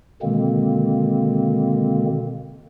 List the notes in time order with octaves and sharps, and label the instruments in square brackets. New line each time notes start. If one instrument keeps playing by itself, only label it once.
[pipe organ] B2 D3 D#3 G#3 A#3 C4